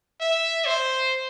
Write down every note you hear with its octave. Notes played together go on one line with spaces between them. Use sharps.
E5
C5